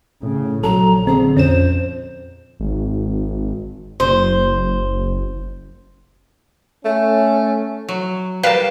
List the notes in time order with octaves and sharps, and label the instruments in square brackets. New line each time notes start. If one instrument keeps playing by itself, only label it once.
[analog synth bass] A2 [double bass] C#3
[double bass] A#1 [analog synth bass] F#3 [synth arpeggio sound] A4 [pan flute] A#5
[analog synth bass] D3 [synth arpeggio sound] C4 [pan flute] G#4
[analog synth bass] F2 [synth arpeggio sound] C#4 E7 [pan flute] C5
[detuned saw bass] G#1
[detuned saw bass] F#1 [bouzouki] C5
[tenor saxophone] A3 [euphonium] C#4
[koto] F#3
[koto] G3 A5 [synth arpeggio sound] A#4 B4 [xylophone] F5